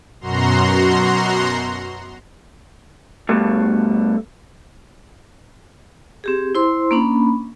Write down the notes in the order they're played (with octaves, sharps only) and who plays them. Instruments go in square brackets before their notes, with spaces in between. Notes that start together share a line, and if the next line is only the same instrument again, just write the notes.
[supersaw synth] F#2 B2 F#4 A#5 C6
[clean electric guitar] G2 B2 A3
[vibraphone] C4 G4 G#4
E4 C5 C6
A#3 C#4 D4 B5